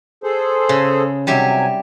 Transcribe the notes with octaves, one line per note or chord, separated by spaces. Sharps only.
G#4 A4 C5
C#3
C3 F#3 G3 G4 E5 G#5